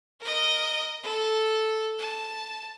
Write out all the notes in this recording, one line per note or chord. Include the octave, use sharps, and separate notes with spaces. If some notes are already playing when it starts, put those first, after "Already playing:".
A#4 D#5
A4
A5